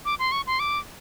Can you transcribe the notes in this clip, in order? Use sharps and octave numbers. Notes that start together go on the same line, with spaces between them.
D6
C6
C#6
C6
D6